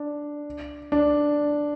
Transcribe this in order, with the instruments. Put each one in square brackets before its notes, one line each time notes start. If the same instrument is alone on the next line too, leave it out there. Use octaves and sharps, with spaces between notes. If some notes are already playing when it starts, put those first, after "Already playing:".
Already playing: [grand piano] D4
D4